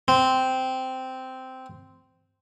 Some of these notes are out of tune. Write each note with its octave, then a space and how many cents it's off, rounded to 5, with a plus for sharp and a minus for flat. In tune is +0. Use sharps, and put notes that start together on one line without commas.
C4 -10